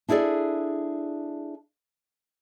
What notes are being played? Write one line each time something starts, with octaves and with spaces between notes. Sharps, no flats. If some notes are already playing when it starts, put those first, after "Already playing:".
D4 E4 G#4 A4 D5